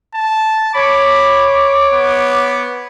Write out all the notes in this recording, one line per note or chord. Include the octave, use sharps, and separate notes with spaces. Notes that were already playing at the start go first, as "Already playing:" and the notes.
A5
C#5 B5 D6
B3